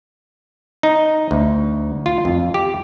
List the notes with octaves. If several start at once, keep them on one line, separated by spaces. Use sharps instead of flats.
D#4
D2
F4
F2
G4